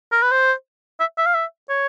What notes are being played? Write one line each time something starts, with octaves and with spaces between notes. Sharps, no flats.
A#4
B4
C5
E5
E5
F5
E5
C#5